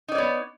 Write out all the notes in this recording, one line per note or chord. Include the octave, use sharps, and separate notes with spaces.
B3 D#4 C#5 D5